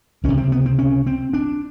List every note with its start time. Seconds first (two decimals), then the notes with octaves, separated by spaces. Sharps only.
0.24 C#2 C3 C#4
0.38 C4
0.52 B3
0.66 C4
0.79 C#4
1.07 C4
1.33 D4